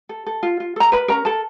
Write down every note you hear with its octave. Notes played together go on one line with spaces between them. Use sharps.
A4
A4
F4
F4
A4 A#5
A#4 B4 B5
C#4 A#4 A#5
A4 A#4 A5